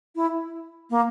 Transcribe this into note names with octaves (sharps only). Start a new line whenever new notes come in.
E4
A#3